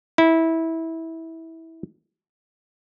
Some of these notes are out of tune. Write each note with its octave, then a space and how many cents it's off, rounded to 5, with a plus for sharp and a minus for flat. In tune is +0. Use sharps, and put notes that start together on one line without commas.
E4 -20